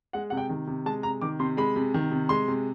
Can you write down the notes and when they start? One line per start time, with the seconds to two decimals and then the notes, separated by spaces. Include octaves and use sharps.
0.13 G#3 F#5
0.30 C3 F#5
0.37 G5
0.49 D#3
0.67 C3
0.86 G#3 A5
1.03 C3 A#5
1.22 D#3 D6
1.39 C3 C6
1.57 G#3 B5
1.76 C3
1.94 D#3
2.11 C3
2.29 G#3 C6
2.48 C3